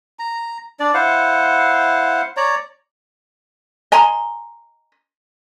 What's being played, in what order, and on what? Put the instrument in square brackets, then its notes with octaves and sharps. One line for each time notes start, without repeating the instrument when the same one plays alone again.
[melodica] A#5
D4 D5
E4 C5 F5 F#5
C#5 D5 A#5
[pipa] D#5 G#5 A#5 C6